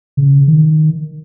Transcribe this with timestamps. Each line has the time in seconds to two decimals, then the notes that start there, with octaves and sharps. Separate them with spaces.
0.17 C#3
0.48 D#3